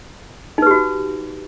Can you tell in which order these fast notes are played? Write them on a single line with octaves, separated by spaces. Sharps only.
D#4 B4 G4 F#4